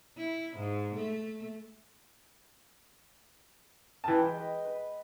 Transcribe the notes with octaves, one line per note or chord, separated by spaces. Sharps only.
E4
G#2
A3
E3 G5 A5 D#6
G#3 G5
B4 D#5
B4